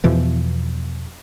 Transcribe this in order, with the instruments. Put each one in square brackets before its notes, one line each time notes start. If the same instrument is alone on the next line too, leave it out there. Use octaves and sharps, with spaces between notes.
[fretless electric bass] E2 B2 E3 F3